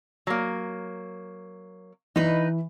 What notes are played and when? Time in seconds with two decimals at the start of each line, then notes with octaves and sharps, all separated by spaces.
0.27 F#3 A#3
2.16 E3 D#4 B4